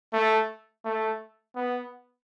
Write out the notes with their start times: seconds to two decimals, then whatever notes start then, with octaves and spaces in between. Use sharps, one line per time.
0.13 A3
0.85 A3
1.56 B3